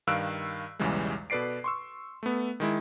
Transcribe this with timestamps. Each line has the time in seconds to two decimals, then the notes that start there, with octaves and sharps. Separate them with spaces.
0.07 G2 D#3 F5 E6 F#6 D7
0.79 B1 E2 C#3 E3 G3 G#3
1.30 B2 A4 B4 D5 C7 D7
1.64 C6 C#6 E6
2.23 A3 B3
2.60 D#3 G#3 E4